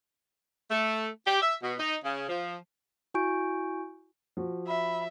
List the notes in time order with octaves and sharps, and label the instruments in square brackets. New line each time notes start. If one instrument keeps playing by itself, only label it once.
[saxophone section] A3
G4
E5
B2
D#4
C#3
F3
[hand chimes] E4 F#4 G#5 C#6 G6 D7
[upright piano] F3 F#4
[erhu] E5 [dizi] B5